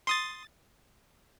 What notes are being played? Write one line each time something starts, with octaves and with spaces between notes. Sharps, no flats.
C6 D#6 A6